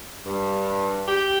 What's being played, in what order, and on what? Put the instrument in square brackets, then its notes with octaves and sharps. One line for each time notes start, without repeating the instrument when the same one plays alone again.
[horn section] G2
G4